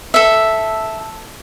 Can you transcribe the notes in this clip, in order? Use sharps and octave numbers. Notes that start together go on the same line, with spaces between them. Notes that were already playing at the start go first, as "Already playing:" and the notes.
A4 E5